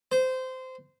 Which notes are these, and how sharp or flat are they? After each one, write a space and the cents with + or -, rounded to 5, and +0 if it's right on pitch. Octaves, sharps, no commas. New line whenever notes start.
C5 -20